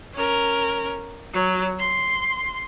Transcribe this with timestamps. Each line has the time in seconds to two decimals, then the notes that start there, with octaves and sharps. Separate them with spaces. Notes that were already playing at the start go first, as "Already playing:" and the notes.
0.14 C#4 A#4
1.33 F#3
1.79 C6